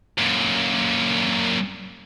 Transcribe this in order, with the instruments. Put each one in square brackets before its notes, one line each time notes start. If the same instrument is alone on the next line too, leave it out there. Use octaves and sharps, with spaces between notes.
[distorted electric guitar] F#2 A#2